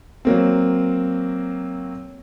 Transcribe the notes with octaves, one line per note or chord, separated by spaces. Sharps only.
F#3 A#3 C4